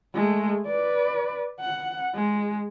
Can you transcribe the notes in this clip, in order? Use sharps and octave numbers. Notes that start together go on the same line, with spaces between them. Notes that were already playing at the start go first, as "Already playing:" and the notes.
G#3 A3
B4 D5
F#5
G#3